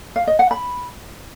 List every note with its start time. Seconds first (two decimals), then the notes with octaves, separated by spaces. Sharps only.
0.16 F5
0.27 D#5
0.39 F#5
0.51 B5